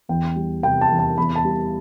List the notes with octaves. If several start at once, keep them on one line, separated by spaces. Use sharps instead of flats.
E2 G5
G3
C3 G5
A5
E2
A5
E2 B5
A5
G3